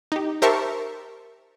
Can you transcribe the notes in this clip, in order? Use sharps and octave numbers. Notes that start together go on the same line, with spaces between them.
D#4 G4
G4 A#4 C5 E5 A5 C#6